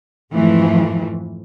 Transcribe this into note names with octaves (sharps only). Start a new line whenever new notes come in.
F2 G#2 E3 F3 A3